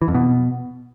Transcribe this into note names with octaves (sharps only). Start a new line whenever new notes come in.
E3
F2
B2